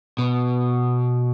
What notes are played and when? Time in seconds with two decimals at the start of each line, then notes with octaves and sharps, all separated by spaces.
0.19 B2